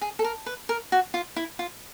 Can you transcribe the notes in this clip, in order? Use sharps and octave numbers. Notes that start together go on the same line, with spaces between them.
G#4
A4
A#4
B4
A#4
F#4
F4
E4
F4